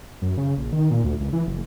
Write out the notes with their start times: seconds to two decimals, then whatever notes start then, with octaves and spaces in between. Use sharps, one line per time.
0.22 F#2
0.37 C#3
0.58 A#1
0.73 D#3
0.91 A#2
1.04 D2
1.20 C#2
1.33 E3
1.47 F#1